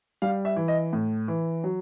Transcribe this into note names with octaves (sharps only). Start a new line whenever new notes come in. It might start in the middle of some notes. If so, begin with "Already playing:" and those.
G3 F5
E5
E3
D#5
A2
E3
F#3